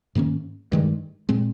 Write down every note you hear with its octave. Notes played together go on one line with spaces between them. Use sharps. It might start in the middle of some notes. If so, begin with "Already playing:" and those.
G#2 D#3 A#3 C#4
G2 D#3 G#3
A#2 G#3 C4